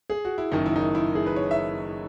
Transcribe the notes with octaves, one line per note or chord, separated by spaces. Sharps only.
G#4
F#4
E4
F#1 F#2 D#3 D#4
E4
D#4
E4
E4
G#4
B4
C#5
E5